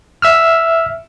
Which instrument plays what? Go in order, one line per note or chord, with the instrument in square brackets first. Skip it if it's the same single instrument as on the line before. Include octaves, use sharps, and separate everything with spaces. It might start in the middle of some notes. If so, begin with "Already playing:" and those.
[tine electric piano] E5 E6 F6